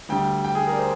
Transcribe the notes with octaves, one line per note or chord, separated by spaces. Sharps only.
D2 D3 G3 G5
G5
G#4
A#4
D5
C5